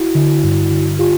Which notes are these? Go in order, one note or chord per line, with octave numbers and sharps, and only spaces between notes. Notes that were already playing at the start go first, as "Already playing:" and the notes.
Already playing: E4 F#4
D3
G2
D3
F4 G4